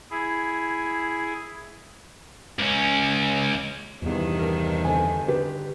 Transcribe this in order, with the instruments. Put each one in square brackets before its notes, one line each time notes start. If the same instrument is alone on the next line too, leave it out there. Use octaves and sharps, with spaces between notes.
[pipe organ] E4 G#4
[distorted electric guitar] C#2 C#4
[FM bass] E2 [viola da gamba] G2 C3 D#3
[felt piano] D4 A#4
[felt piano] D3 C4 A4 [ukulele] G#5
[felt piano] D3 G4 [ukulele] B4